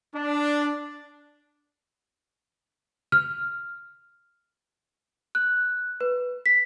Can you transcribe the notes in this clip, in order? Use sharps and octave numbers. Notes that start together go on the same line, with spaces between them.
D4
F6
F#6
B4
B6